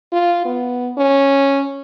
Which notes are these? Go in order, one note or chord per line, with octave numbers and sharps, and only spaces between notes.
F4
B3
C#4